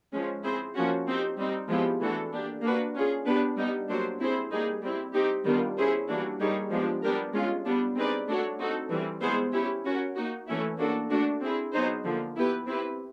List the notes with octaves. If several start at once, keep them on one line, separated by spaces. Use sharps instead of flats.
F3 G#3 C#4
C4 E4 G#4 C5
F3 A#3 C#4 F#4
C4 D#4 G4 C5
G3 C4 D#4
F3 G#3 B3 E4 G4
E3 A3 D4 F#4 A4
A#3 D4 G4
A#3 D4 F#4 B4
C#4 F4 G#4
B3 D4 G4 B4
G3 B3 D#4
F#3 A#3 D4 G4 C5
C4 E4 G#4 C5
G3 A#3 D#4 G#4
G3 C4 E4
C4 D#4 G4
D#3 G3 B3 D4 F4
C#4 E4 G#4 C5
E3 G3 A#3 D4 F#4
G3 A#3 D#4 G#4 C#5
F3 G#3 B3 D4 G4
G3 B3 D4 G4 A#4
G#3 C#4 F4
G3 B3 D4
C4 D#4 G#4 B4 D5
A3 D4 F#4 A4 C#5
C4 D#4 F#4 A4
E3 G3 C4
G#3 B3 E4 G#4 C5
C#4 E4 G4
C#4 F#4 A#4
A#3 D#4 F#4
E3 A3 C#4 E4
A#3 D4 F#4 A4
A3 D4 F#4
C4 E4 G#4
F#3 B3 D#4 G#4 C5
D3 F3 A#3
B3 E4 G4 B4
C4 E4 G4 B4